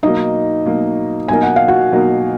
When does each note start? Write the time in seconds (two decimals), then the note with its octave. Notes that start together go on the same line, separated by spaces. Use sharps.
0.03 B2 F#3 A#3 D#4 D#5
0.65 B2 F#3 A#3
1.28 B2 F#3 A#3 D#4 A#4 G#5
1.43 F#5
1.56 F5
1.68 F#4 F#5
1.92 B2 F#3 A#3 D#4 A#4